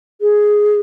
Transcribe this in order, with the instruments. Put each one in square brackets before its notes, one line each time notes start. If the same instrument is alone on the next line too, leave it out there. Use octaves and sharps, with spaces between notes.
[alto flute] G#4